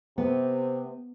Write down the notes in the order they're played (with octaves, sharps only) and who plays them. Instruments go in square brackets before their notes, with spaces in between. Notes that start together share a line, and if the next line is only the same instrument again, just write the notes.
[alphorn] C3 [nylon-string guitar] B3